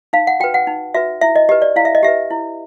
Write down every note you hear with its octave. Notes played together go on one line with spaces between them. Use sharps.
D#4 F5
F#5
F#4 B4 G5
F#5
D#4
F#4 B4 E5
E4 E5
D#5
G4 B4 D#5
D5
E4 F5
E5
D#5
G4 B4 E5
E4